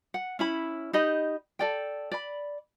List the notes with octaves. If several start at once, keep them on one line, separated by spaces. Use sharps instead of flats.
F#5
C#4 E4 B5
D#4 G4 D#5 B5
A4 D5 G5
D5 B5